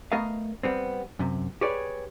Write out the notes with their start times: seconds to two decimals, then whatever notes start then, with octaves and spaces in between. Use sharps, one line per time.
0.12 A3 B3 A#4 D#5 F5
0.63 G3 B3 C4
1.19 F#2 C3
1.61 G4 G#4 B4 C#5 D5